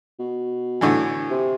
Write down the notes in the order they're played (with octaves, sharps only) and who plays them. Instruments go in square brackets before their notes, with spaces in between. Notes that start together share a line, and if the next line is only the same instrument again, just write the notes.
[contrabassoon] B2
[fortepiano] A2 D3 E3
[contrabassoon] C3